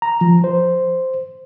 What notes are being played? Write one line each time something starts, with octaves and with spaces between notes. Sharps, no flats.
A#5
F3
C5